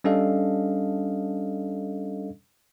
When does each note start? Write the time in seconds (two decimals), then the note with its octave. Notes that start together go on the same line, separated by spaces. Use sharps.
0.04 G3 C#4 D4 A4 D#5 F5